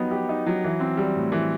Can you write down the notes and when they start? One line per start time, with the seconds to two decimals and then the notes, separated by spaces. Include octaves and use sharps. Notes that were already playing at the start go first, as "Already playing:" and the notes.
Already playing: F#3 B3 D#4 G4
0.11 G4
0.29 D#4
0.46 F#3
0.64 E3
0.80 C4
0.97 G3
1.16 A2
1.32 E3